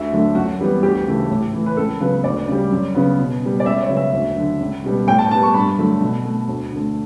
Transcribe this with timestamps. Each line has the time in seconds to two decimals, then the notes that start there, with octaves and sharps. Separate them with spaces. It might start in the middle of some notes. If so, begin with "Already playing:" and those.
Already playing: D2 E5
0.12 D3 F#3 A3
0.35 F#2 F#4
0.59 E3 G3 B3
0.83 D2 G4
1.06 C#3 E3 A3
1.30 A2
1.53 E3 A3
1.66 B4
1.77 C#2 A4
2.00 C#3 F#3 B3 B4
2.24 D2 D5
2.48 C#3 G3
2.71 F#2
2.95 C#3 F#3 B3
3.19 B2
3.42 G3 B3
3.60 D5
3.66 C#2 E5
3.81 C#5
3.89 C#3 F#3 B3
3.97 E5
4.13 D2
4.37 D3 F#3
4.60 C#2
4.84 B2 G3 B3
5.07 A2 G5
5.18 A5
5.31 B3 A5
5.35 G3
5.43 C#6
5.54 G2 B5
5.78 D3 F#3 A3
6.01 B2
6.25 A3
6.49 D2
6.72 D3 A3